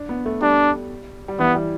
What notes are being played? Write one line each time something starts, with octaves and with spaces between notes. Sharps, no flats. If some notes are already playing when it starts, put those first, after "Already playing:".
Already playing: D4
B3
A3
G3 D4
G3
E3 B3
G3